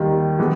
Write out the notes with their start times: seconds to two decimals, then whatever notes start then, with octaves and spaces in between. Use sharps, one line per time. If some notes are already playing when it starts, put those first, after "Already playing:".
Already playing: D#2 D#3 G3
0.39 E3 G#3 B3